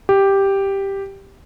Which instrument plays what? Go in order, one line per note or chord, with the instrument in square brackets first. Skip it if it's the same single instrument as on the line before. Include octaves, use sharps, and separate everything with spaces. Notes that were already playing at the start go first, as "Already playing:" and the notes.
[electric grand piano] G4